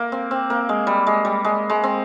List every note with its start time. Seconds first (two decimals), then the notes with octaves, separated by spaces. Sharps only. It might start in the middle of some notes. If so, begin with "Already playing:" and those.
Already playing: A#3
0.12 C4
0.31 C4
0.50 A#3
0.69 G#3
0.87 G3
1.07 G#3
1.25 G3
1.45 G#3
1.70 G#3
1.84 C4